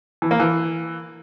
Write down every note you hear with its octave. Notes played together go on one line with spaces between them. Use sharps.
E3
A#3
E3